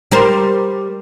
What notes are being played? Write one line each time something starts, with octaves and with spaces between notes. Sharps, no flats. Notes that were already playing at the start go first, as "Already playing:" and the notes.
G3 A#4 C5